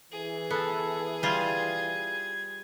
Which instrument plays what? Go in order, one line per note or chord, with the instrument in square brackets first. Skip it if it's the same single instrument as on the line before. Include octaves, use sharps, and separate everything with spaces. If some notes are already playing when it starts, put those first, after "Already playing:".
[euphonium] E3 [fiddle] G#4
[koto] B3 [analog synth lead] A4
[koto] G3 F4 [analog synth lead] G#6